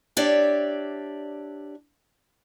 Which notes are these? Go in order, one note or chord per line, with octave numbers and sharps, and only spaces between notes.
D4 G4 C#5 D5 E5